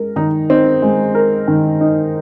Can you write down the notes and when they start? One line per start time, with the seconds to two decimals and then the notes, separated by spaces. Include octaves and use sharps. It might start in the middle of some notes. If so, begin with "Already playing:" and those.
Already playing: G#3 A#4
0.16 D#3 D#4
0.50 C4 D#4
0.82 G#3
1.15 A#4
1.48 D#3
1.81 D#4